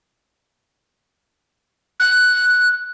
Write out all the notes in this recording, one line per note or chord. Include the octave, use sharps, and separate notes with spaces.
F#6